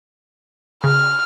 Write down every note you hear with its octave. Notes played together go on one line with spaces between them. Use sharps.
C#3 F6